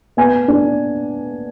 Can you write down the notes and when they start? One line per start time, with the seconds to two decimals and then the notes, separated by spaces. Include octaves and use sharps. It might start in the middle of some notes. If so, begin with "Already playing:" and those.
0.17 B3 G#5
0.48 D4